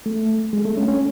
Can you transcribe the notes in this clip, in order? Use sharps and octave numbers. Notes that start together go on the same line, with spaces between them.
A3
G#3
A3
C#4
C#4